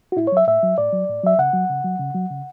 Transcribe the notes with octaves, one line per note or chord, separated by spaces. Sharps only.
F#4
A2 E4
C#5
F#3 E5
A2 E5
F#3
A2 D5
F#3
A2
F#3 E5
C#3 F#5
F#3
C#3
F#3
C#3
F#3
C#3